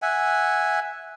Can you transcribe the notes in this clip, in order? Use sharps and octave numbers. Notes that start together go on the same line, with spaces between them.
E5 F#5 G#5